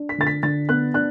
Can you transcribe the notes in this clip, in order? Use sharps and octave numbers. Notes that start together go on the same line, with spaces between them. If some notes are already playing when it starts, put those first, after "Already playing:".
Already playing: D4
B6
D3 A6
B6
D3 A6
B3 F#6
D4 F#6